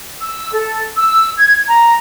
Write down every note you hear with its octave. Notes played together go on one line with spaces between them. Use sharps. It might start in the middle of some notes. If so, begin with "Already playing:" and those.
E6
A4
E6
G#6
A#5